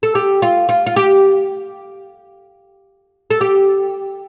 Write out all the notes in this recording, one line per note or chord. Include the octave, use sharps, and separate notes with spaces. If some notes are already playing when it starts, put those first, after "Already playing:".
A4
G4
F4
F4
F4
G4
A4
G4